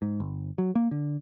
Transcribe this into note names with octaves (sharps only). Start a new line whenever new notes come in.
G#2
G1
F#3
A#3
D3